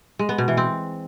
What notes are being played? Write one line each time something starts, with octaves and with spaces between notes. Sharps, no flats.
G#3
B3
B2
E3
C4